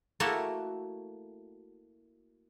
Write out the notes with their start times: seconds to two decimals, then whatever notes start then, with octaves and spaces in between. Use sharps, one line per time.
0.20 A3 A#3 E4 F#4